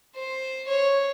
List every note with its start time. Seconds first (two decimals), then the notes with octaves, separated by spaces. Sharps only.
0.15 C5
0.68 C#5